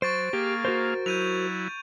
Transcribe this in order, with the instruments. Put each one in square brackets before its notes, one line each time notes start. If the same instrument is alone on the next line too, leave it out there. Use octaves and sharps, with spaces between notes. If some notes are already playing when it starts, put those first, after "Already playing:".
[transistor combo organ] F#3 [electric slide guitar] C5 [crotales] C#6 A6 D7
[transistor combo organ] A#3 G#4 F5 [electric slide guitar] G4
[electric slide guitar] F#4 A#4 C5
[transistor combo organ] F#3 E4 [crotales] G6 D#7 F7